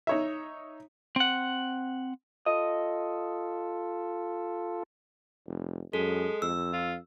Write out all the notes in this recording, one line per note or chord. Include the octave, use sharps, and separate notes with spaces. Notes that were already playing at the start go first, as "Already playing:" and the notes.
D#4 C#5 E5
C4 F#5
F4 A4 D#5
F1
F#2 G#3 A4
F2 E6
F4